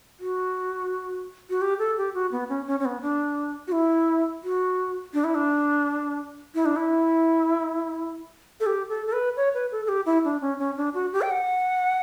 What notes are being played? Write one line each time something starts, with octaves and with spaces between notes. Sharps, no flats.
F#4
F#4
G4
A4
G4
F#4
B3
C#4
C#4
C#4
B3
D4
F#4
E4
F#4
D4
E4
D4
E4
D4
E4
A4
G4
A4
A4
B4
C#5
B4
A4
A4
G4
E4
D4
C#4
C#4
D4
F#4
G4
G5
F#5